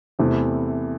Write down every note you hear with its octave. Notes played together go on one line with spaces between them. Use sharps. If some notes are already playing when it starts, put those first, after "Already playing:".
E2 C3 E3 A3 C4